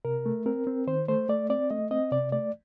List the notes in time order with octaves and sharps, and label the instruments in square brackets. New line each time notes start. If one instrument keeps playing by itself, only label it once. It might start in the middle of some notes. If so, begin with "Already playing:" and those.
[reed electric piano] C3 A#4
A3
C4 A#4
C4
D#3 C5
A3 C5
A3 D5
C4 D5
A3 D#5
C4 D#5
C3 D5
A3 D5